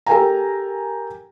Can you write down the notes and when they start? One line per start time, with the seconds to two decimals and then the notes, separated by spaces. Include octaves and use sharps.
0.06 G4 A4 A#4 G5 G#5 A#5